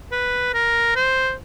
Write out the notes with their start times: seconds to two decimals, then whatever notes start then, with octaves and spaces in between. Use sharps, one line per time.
0.12 B4
0.54 A#4
0.96 C5